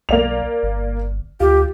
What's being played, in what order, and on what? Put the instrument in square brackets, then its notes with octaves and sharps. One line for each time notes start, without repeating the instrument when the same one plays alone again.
[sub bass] B1 [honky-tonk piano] A#3 D5 F7
[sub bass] G1
[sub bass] D2 [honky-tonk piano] F4 [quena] G4